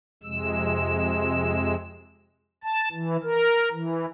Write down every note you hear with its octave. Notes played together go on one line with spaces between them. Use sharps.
F2 C3 G#3 E6
A5
E3
A#4
E3